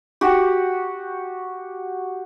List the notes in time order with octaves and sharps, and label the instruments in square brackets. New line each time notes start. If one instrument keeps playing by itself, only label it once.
[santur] F#4 G4